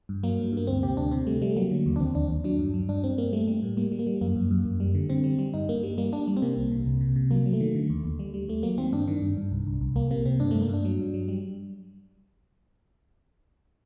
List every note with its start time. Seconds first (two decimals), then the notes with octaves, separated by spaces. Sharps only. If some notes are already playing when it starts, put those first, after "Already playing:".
0.09 G2
0.23 F#3 A#3
0.38 G2
0.53 G2 A#3
0.67 D2 C4
0.83 C3 G4
0.97 D2 D4
1.11 C3 C4
1.27 G3 A3
1.42 G3 A3
1.56 F#3 A#3
1.71 D3
1.86 D#2
1.96 D4
2.00 D#2 C4
2.15 D#2 D4
2.30 D#2
2.44 F#3 D4
2.59 G2
2.74 F#3
2.89 G2 D4
3.03 G2 C4
3.18 G2 A#3
3.33 G3 A3
3.47 G3
3.63 A2
3.77 G3 A#3
3.92 G3
3.99 A#3
4.07 G3
4.21 F#2 A#3
4.36 F#2
4.51 F#2
4.65 F#2
4.80 G3
4.95 D3
5.10 D3 C4
5.24 G3
5.39 G3
5.54 G2 D#4
5.69 G2 A#3
5.83 G3
5.98 G3 A#3
6.13 G3 D4
6.28 G3
6.37 C4
6.42 C3 A#3
6.57 C2
6.72 C3
6.86 C2
7.01 C3
7.16 C3
7.31 F#3 A#3
7.46 F#3
7.53 A3
7.61 D#3
7.75 D3
7.90 D#2
8.04 D#2
8.19 G3
8.34 G3
8.48 D#2 A3
8.63 F#3 A#3
8.78 D#3 C4
8.92 G2 D4
9.08 D#3 D4
9.22 G2
9.37 G2
9.52 C2
9.67 C2
9.81 C2
9.96 C2 A#3
10.11 C3 A#3
10.25 C3 C4
10.40 G2 D4
10.51 G2 A3
10.62 A#3
10.69 G2 D4
10.85 F#3
10.99 G2
11.14 F#3
11.28 G3